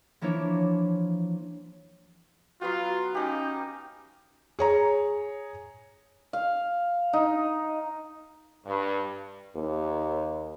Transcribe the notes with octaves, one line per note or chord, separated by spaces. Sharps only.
E3 F3 A#3 D4 E4 C#5
F#3 B3 F4 F#4
C#4 D#4 G4
G#4 C#5 A#5
F5
D#4
G2
D#2